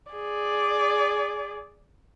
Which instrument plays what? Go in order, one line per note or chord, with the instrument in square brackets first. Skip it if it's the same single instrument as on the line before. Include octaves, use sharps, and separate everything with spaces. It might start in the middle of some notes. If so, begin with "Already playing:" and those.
[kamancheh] G#4 D5